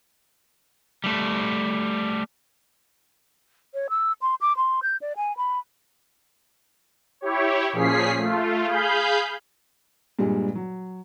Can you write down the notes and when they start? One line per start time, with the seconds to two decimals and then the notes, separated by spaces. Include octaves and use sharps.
1.04 G3 A3
3.74 C#5
3.90 E6
4.22 C6
4.41 D6
4.57 C6
4.83 G6
5.01 D5
5.17 G#5
5.37 B5
7.21 E4 G4 C#5
7.72 A#2 F3 C#4 G#4 B6 C7
8.17 A3 F4
8.66 G#4 F5 B5 G6
10.19 G2 A#2 G3 G#3
10.55 F#3